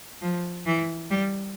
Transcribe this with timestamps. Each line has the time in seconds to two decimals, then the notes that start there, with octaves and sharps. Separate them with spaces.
0.21 F3
0.66 E3
1.10 G3